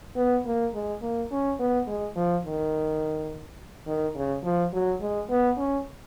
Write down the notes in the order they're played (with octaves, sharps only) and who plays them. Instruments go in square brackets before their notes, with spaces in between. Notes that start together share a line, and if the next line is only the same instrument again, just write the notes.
[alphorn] B3
A#3
G#3
A#3
C#4
B3
G#3
F3
D#3
D#3
C#3
F3
F#3
G#3
B3
C#4